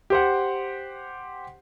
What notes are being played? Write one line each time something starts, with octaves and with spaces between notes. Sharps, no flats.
G4 C5 F#5